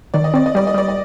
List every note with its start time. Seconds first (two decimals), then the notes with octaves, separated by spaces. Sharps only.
0.14 D#3 D5
0.24 D#5
0.34 C4 D5
0.46 D#5
0.55 G3 D5
0.67 D#5
0.74 G3 D5
0.89 D#5